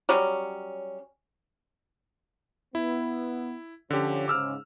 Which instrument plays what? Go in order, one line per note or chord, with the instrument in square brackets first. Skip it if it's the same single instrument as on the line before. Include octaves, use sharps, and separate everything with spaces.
[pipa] F#3 G3 C#4
[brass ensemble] B3 [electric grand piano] E4
[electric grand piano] D3 G4 [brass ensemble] F3 C#4
[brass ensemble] G#2 C#3 [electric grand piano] D6 E6 F6